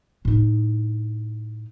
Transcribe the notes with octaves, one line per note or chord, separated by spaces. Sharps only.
A2 D#4